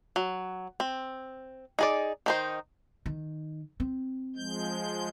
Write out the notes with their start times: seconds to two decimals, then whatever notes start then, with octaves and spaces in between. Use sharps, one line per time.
0.16 F#3
0.80 C4
1.79 D#4 G#4 D5
2.26 D#3 D#4 C5
3.06 D#3
3.80 C4
4.36 F3 G#3 G6